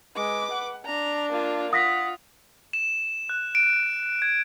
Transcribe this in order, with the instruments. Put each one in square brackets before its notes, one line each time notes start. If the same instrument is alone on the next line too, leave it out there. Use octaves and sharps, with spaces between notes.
[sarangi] G#3 [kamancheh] B4 D6
[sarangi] F#5
[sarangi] D4 [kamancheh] A#5
[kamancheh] A#3 F4
[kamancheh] F4 [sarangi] F#5 [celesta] D#6 A#6 B6
[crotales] E7
F#6
D7
G#6